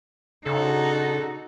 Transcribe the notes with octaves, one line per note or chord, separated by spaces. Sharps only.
A#2 C#3 D4 D#4 F#4 A4